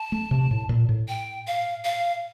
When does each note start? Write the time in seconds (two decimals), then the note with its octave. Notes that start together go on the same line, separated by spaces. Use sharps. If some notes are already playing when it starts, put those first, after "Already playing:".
Already playing: A5
0.12 A3
0.31 C3
0.51 A2
0.69 A#2
0.89 A2
1.08 G5
1.47 F5
1.85 F5